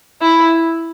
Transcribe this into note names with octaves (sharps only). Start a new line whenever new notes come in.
E4